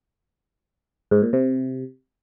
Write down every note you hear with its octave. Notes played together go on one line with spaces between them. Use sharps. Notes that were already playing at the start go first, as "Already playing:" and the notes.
G#2
A#2
C3